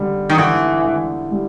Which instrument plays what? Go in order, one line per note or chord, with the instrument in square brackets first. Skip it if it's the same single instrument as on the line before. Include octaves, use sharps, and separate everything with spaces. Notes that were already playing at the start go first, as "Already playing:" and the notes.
Already playing: [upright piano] D3 G3
[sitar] D#3
[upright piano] D3 [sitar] E3
[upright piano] D3
G3